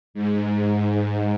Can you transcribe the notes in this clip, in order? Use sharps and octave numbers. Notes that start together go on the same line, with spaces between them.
G#2